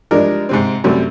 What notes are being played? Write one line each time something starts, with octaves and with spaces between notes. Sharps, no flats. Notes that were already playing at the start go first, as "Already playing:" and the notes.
F3 G3 G#3 D4 A#4
G#2 C3 C4
F#2 C3 G3 A3